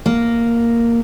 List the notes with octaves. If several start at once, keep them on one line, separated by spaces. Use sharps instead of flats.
A#3